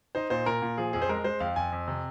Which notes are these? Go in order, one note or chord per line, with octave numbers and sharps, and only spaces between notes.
D#4 C5
A#2 C5
A#2 A#4
A#2
F3 G#4
F2 G#4
C5
G#3 A#4
G#3 C5
F2 F5
F2 G#5
F2
C3